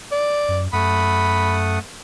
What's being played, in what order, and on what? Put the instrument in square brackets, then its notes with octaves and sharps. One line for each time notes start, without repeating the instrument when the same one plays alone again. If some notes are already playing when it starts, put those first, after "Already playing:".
[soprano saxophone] D5
[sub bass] F#2
[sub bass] F#2 [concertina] A3 F#5 D#6 [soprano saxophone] B5